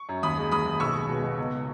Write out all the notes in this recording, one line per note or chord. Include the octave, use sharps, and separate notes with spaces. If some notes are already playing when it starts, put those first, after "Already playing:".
Already playing: C#6
F#2
D#2 B5 D#6
G#3
D#2 B5 D#6
D#2
B1 C#6 E6
G#3
B2
B2
C#2